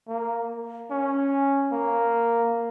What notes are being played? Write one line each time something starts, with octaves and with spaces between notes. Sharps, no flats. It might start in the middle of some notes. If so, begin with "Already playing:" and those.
A#3
C#4
A#3